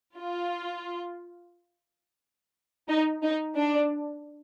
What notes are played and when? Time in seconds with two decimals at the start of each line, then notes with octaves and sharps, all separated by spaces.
0.18 F4
2.89 D#4
3.23 D#4
3.56 D4